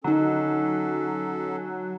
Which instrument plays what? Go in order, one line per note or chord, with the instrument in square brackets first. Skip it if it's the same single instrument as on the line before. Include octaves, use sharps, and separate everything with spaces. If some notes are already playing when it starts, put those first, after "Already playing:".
[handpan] D3 D#4 [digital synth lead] F#3 [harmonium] C#4 A4